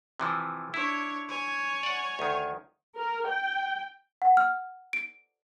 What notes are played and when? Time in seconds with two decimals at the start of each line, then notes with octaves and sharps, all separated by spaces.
0.20 C3 E3 F3
0.74 D4 E4 C#5
1.29 C#5 G#5
1.83 D5 F#5
2.19 D2 D#3
2.97 A#4
3.29 G5
4.22 F#5
4.37 F6
4.93 D7